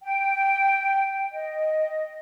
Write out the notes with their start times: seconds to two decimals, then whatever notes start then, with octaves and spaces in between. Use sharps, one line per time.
0.02 G5
1.32 D#5